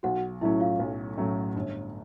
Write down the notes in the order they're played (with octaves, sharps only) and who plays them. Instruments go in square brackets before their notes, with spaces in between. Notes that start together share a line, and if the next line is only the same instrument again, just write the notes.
[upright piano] B1 [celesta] F#4 F#5
[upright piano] A2 F#3 A3 C#4 [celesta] E4 E5
[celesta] F4 F5
[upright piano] B1
A2 F#3 A3 C#4
G1